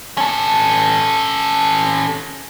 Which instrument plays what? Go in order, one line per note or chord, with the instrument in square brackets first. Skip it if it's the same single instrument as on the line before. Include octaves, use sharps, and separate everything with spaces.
[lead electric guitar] C#4 A4